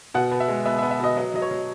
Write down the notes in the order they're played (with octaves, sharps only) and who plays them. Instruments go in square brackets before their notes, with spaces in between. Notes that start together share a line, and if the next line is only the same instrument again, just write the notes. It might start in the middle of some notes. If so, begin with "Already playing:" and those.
[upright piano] B2 F#5
B2
E5
G#3
B3 E5
E5
B3
E5
B2 D#5
F#3 D#5
F#3 D#5
C#5
F#3